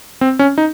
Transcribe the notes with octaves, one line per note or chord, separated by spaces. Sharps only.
C4
C#4
D#4